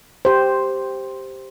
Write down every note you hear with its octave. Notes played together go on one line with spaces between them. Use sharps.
G4 C5